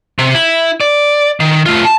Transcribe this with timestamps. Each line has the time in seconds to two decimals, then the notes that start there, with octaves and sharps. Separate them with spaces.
0.19 C3
0.34 E4
0.81 D5
1.40 D#3
1.66 A3 F4
1.85 A5